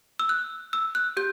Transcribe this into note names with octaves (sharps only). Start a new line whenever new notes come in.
E6
F#6
E6
F#6
G4 G6